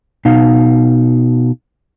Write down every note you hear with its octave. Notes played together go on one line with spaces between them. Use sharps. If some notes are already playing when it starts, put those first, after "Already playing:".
B2 D#4 F5